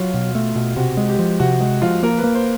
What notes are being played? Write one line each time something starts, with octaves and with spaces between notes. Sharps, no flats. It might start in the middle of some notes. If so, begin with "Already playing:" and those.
Already playing: F#3 F4
B2
A3
B2
C3 F#4
G#3
G4
F3
C3 F#4
G#3
F3 F4
A#3 A#4
B4
A#3
C5